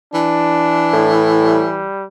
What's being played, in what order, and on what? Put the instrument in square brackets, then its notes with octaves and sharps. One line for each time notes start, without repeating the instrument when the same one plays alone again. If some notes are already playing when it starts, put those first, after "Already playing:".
[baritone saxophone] E3 [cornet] D4
[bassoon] A2
[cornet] G3